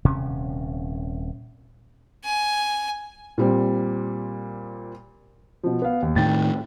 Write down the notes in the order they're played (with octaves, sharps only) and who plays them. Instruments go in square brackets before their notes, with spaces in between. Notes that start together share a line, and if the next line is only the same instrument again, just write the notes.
[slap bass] D#1 C3 C#4
[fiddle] G#5
[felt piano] A#2 G3 C4
[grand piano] B2 F3
B3 F5
D#2
[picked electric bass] A2 D#3 [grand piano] G5 A6